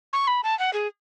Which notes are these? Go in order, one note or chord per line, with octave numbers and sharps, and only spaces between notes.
C#6
B5
A5
F#5
G#4